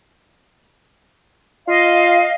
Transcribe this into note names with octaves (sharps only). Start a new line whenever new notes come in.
F4 D#5 F5